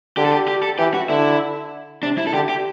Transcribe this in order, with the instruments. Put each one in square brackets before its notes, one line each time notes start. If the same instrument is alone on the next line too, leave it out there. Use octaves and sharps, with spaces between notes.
[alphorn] D3 [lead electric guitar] G4
[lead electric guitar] A4
G4
G4
A4
[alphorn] E3 [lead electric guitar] G4
[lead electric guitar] F#4
[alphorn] D3 [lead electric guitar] E4
[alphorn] C3 [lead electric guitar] D4
[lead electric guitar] E4
A4
[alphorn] D3 [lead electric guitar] G4
[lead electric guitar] G4